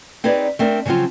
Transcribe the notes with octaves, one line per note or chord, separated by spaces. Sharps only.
C4 D#4 G#4 B4 C#5 D5
A3 C4 D4 A#4
C#3 F3 F#3 C4 F4